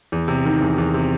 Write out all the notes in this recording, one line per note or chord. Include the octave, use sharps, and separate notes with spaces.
E2
C3
D#3
E2
E2
C3